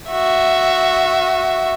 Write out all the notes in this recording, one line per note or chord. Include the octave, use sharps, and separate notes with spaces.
F#4 E5